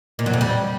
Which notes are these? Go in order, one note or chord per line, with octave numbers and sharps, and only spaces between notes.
A#2
F#3
F2
G3